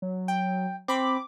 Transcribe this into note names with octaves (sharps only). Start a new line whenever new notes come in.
F#3
G5
C4 B5 D6